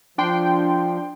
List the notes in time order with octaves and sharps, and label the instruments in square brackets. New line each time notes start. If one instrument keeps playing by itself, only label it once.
[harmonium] F3 [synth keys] D4 G5 C6